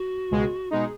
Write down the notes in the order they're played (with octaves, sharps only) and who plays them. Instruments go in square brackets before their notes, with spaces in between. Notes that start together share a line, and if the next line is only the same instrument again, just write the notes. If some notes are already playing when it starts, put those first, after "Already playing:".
Already playing: [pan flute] F#4
[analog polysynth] C#2 B2 G#3
[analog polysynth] B2 G#3 D#4 [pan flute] G#4